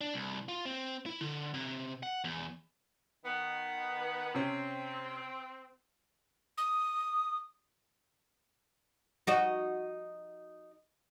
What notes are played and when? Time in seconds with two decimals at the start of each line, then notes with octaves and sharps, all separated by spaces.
0.01 D4
0.14 C2
0.48 F4
0.65 C4
1.06 E4
1.21 D3
1.54 C3
2.03 F#5
2.24 E2
3.25 D#3 B3
4.35 C3 C4 C#4
6.58 D#6
9.27 D#4 F#4 D#5